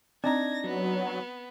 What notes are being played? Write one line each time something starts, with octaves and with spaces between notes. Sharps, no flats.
C4 D4 D#4 A#5 G#6 A#6
F#3 B3